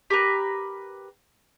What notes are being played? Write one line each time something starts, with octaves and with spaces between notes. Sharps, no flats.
G4 A#4 B4